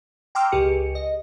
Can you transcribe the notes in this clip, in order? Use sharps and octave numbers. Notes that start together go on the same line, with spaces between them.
G5 A#5 C6 D6 E6 F6
C#2 G4 G#4 C#7
D#5